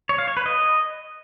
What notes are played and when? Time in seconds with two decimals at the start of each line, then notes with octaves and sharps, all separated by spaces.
0.09 C#5
0.18 F5
0.28 C#5
0.37 B4
0.46 D#5